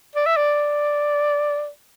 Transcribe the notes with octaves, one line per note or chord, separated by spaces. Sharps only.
D5
E5
D5